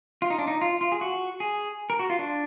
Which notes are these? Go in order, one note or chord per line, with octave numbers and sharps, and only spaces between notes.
F4
D#4
D4
D#4
F4
F4
G#4
F#4
G#4
A#4
F#4
F4
D4